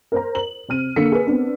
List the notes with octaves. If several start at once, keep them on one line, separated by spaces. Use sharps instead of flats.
A#4 C5 A#5
F#7
C3 C4 F6 D#7
D3 A#3 A4 E6 B6 C#7
G#4 A#4 B4
B3 C4 D4